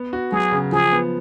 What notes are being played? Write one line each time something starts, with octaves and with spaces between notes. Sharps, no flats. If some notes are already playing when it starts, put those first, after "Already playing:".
Already playing: B3
F#4
F#3 G#4
C#3
F3 G#4
B3